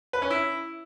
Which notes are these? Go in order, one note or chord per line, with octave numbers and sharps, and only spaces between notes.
B4
C#4
E4